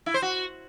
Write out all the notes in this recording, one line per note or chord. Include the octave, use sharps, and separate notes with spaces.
E4
C5
F#4